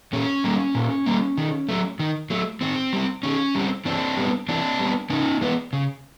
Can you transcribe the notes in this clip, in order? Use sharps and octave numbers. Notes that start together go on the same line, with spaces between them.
A#2 C#4
G3 A#3
A#2
G3 A#3
D#3
F#3 A3
D#3
F#3 A3
D#3 C4
G3 C4
D#3 C#4
G3 C4
E3 C4 D4
G3 B3
E3 C4 D4
G3 B3
C#3 C#4 D#4
E3 G#3 B3
C#3